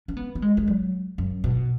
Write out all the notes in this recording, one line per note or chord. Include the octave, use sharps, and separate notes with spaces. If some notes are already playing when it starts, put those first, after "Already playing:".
C#4
B3
B3
G#3
G#3
F#3
F#2
B2